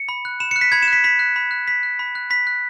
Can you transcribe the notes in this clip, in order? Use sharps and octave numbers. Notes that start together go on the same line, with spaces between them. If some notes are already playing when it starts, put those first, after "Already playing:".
Already playing: C#7
B5
F#6
B5 E7
F#6 C#7
B6
B5 G#6
E7
F#6 B6
B5 B6
F#6
B5
F#6
B5 B6
F#6
B5
F#6
B5 B6
F#6